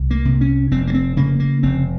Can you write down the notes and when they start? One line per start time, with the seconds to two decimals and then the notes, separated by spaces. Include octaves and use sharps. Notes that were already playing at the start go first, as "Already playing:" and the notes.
Already playing: C2
0.11 A#3
0.25 C3
0.41 C#4
0.71 F1 C4
0.87 A#3
0.94 C4
1.17 C#3 A#3
1.40 A#3
1.63 F1 C4